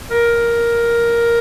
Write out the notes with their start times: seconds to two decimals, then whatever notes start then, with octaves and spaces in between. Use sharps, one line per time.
0.11 A#4